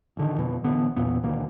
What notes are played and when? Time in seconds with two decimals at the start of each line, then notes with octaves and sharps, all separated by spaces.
0.17 A1 D3 D#3
0.38 F2 B2
0.64 A1 D3 B3
0.97 B1 E2 A#2 B3
1.23 D2 B2 D#3 A#3